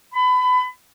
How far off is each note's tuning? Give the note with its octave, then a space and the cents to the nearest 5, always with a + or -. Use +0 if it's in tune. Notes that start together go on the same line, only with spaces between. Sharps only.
B5 +25